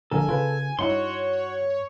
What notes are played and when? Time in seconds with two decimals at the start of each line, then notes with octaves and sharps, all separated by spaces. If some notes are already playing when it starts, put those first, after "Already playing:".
0.11 A#1 D3 A4 A#4 G#5
0.29 C#3 F4 B4
0.79 G2 D#4 E4 F#4 C#5 F#5 C6